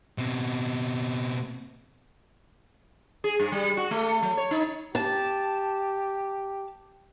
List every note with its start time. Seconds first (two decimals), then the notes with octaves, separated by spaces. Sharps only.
0.18 B2 C4
3.24 G#4
3.39 G2
3.52 G3
3.77 F#4
3.91 A3
4.22 F#3
4.37 C#5
4.51 D#4
4.95 G4 A5